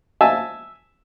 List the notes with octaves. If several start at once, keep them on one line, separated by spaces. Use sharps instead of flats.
E5 G#5 A5 E6